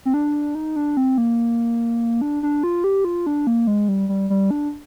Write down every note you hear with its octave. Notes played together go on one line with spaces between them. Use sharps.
C4
D4
D#4
D4
C4
A#3
D4
D4
F4
G4
F4
D4
A#3
G#3
G3
G3
G3
D4